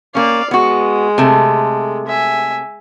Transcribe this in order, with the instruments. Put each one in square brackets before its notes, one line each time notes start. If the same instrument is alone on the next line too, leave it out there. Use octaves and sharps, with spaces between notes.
[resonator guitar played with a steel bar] A#3 C#4 [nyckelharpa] D5 F5
[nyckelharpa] G#3 [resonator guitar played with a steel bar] B3 F#4
[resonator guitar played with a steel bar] C3 A3
[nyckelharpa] E5 G#5